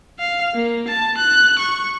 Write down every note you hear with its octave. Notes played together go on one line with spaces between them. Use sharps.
F5
A#3
A5
F#6
C#6